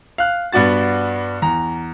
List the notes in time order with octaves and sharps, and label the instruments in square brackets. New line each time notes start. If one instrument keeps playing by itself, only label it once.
[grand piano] F5 F#6
G2 B3 D4 F#4 A6
E2 A#5